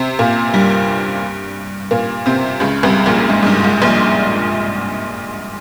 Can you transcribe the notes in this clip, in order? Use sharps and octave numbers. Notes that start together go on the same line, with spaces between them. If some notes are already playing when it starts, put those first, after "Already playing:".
Already playing: C3 C4
A#2 A#3
G2 G3
A#2 A#3
C3 C4
C#2 C#3
C2 C3
A#1 A#2
G#2
G#2
G2
G#2
A#1 A#2